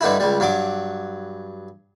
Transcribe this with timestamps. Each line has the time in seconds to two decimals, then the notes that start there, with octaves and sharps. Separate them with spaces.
0.01 G2 D3 D#4 E4
0.20 C#2 G3
0.40 G2 F#3 D6